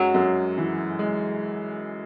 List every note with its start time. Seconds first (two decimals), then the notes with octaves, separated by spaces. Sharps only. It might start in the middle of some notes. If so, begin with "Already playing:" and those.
Already playing: F#2 F#3 G#3
0.14 F#2
0.57 E3
0.99 G#3